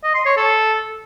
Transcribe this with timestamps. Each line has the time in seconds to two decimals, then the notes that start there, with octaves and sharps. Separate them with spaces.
0.03 D#5
0.14 C6
0.25 C#5
0.37 A4